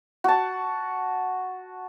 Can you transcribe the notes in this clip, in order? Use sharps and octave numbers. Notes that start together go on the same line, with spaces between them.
F#4 A5